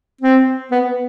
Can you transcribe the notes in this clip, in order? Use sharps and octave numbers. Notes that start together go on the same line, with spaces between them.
C4
B3